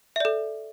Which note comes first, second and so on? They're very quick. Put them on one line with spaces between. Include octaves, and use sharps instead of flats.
E5 D5 A4